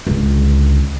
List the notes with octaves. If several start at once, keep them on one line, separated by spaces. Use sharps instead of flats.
C#2 D3